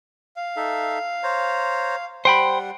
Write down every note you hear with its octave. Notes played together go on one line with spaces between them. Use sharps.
F5
D#4 A4 E5
C5 C#5 A#5
G3 C5 F#5 G5 B5